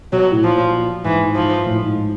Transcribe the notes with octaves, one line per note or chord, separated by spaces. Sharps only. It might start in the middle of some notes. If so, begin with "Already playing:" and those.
B2 F#3
A2
A#2 F3
G#2 E3
G#2
F3
A2
G#2